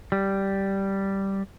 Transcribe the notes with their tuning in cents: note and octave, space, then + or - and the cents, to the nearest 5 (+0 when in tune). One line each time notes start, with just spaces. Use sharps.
G3 -5